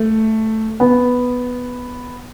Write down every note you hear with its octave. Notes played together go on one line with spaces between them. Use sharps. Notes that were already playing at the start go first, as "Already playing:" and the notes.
Already playing: A3
B3